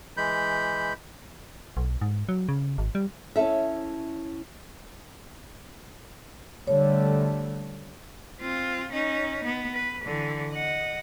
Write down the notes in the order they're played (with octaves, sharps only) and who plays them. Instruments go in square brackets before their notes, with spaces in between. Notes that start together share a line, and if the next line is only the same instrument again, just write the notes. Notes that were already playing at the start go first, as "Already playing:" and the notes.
[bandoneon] E3 G#3 B5 G6
[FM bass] B1
G#2
F#3
C#3
G#1
G3
[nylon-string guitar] C#4 E4 A4 E5
[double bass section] D3 G3 A3 [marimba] C#5
[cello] C4 F4
C#4 D#4
B3
B4
D3 E3
D#5 F#5